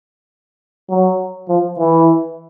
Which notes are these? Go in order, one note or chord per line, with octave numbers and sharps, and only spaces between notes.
F#3
F3
E3